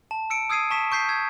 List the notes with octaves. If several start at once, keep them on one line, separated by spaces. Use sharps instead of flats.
A5
E6 C#7 D7
D#6 E6 G#6 C7 D#7
A5 C#6 B6 E7
C#6 G6 B6 C7
E6 G#6